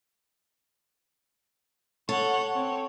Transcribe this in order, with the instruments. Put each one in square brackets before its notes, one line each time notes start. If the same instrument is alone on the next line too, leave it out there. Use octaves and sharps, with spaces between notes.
[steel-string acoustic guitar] A4 [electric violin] C#5 F#5
[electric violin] C4 C#5